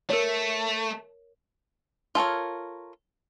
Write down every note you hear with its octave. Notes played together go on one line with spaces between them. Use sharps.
A3 A#4 C#5
F4 A4 A#4 C#5